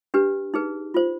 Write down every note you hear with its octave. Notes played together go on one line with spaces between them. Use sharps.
D4 G4 B4
D#4 G#4 B4
F4 C5